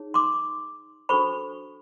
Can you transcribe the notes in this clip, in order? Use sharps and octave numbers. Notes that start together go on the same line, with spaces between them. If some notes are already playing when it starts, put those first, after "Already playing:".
Already playing: D#4 G#4 C#5
C6 D6
D4 F#4 A4 C5 B5 C#6